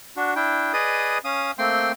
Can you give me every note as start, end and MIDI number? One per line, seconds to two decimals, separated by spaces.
0.17 0.34 62
0.17 0.34 66
0.36 0.73 62
0.36 0.73 64
0.36 0.73 79
0.73 1.18 68
0.73 1.18 71
0.73 1.18 74
0.73 1.18 75
0.73 1.18 87
1.25 1.51 61
1.25 1.51 77
1.25 1.51 87
1.58 1.92 57
1.58 1.92 58
1.58 1.92 60
1.58 1.92 79
1.58 1.92 84